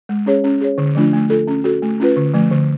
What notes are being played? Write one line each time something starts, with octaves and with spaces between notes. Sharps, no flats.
G#3
C#4 G#4 C#5
C#4
G#4 C#5
D3
F3 A3 D4 F4
A3
F4 A4
C#4
F#4 A4
A3
C#4 F4 B4
D3
F3 A3
D3